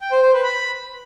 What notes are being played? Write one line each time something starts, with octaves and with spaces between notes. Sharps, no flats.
G5
C5
C5
B4
B5